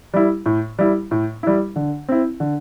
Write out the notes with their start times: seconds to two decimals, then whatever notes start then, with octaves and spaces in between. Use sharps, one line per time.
0.14 G3 E4
0.46 A2
0.79 G3 E4
1.11 A2
1.43 G3 E4
1.76 D3
2.09 C4 E4
2.40 D3